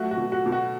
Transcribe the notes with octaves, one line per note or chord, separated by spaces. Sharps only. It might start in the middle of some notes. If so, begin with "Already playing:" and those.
Already playing: F#3 A3 F#4
F#4
B2
F#4
B2
F#4